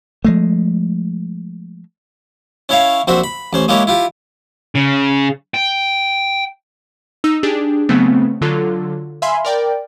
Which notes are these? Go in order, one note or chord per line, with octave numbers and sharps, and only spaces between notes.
F3 G#3 A3
C#4 E4 C#5 E5 F5
A#1 C4 F#4 C5 E5
B5
A1 C#4 C5
G#3 A#3 E4 G4 C#5
E4 F4 G4
C#3
G5
D#4 E6
D4 G4 G#4
C#3 F#3 A3 B3 C4
D3 F#3 F4 A4
E5 F5 G#5 B5 C6
A#4 D5 G5